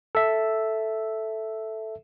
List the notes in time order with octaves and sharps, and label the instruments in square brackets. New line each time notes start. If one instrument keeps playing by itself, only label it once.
[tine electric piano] A4 E5